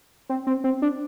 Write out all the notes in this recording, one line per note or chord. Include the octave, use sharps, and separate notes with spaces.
C4
C4
C4
D4